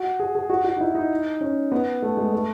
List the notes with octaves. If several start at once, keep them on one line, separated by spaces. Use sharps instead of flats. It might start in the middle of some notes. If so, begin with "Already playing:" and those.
Already playing: F#4
G#4
G#4
F#4
F#4
D#4
E4
D#4
C#4
B3
A3
G#3
A3